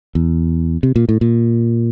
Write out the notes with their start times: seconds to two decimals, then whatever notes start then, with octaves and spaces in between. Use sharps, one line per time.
0.15 E2
0.83 C3
0.96 A#2
1.09 A2
1.21 A#2